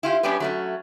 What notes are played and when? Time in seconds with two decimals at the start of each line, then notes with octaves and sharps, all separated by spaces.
0.03 E4 F4 G4
0.23 G3 B3 C#4 D4 G4 B4
0.40 F#3 A3 C#4